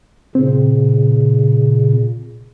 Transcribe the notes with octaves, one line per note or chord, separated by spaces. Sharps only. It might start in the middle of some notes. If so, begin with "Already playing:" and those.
A#2 C#3 C4